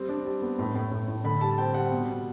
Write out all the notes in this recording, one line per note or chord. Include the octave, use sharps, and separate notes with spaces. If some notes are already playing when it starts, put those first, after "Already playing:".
Already playing: G3 C4
D4
G3
B3
A2
A2
A2
A2
D3 B5
G3 A5
C4 G5
G3 F#5
B2
B2